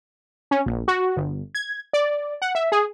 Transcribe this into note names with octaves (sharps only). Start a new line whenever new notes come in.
C#4
A#1
F#4
G1
G#6
D5
F#5
E5
G#4